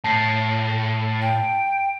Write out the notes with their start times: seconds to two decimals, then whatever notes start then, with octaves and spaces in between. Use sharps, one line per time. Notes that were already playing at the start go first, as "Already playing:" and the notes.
0.04 A2 A5 C7
1.22 G5